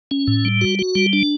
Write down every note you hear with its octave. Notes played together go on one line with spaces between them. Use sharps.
C#4
A2
G3
F#4
F#4
G3
D4